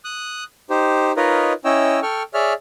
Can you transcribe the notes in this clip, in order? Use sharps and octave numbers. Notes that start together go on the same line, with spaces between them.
D#6 F#6
D#4 G4 C5
D#4 F4 A#4 B4 C#5 D#5
C#4 E4 C#5 D#5 G5 E6
A4 G5 C#6 F6
G#4 C#5 D5 E5 F6